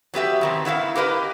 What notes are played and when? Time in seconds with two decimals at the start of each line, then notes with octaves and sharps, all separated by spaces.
0.14 F#3 B3 G4 E5
0.41 A2 D#3 C4
0.65 B3 E4 E5 F5
0.95 G4 A#4 B4 D#5